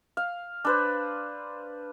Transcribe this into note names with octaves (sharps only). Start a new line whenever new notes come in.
F5
D4 B4 C5